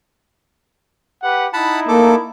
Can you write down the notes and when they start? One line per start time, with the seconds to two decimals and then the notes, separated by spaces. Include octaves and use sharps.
1.22 G4 B4 F#5
1.53 D#4 E4 F#5 A5 B5
1.88 A3 A#3 A4 D6